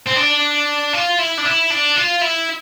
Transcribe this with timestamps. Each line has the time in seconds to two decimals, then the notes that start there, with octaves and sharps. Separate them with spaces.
0.06 C4
0.16 D4
0.93 F4
1.19 E4
1.38 D4
1.45 E4
1.71 D4
1.96 F4
2.21 E4